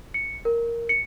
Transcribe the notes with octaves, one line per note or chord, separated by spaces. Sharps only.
C#7
A#4
C#7